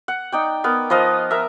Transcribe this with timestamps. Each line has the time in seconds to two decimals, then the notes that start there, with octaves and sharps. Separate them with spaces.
0.08 F#5
0.32 D#4 D5 G5
0.64 B3 A#4
0.90 F3 B4 D#5 F5
1.31 A#4 E5